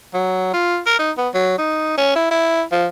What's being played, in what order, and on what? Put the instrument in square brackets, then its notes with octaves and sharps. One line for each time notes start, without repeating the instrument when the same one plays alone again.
[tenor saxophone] F#3
F4
A#4
D#4
B3
F#3
D#4
C#4
E4
E4
F3